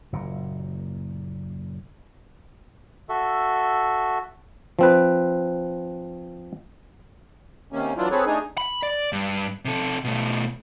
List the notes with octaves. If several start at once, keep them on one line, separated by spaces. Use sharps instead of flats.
F#1 A#2
F#4 A4 E5
F3 C4 B4
C3 D#3 A#3 C#4
E3 F#3 D4 E4 F4
C4 G#4 A4 B4 C#5
A3 D4 D#4 G#4 G#5
B5
D5
G2
C3 A4
B2 A3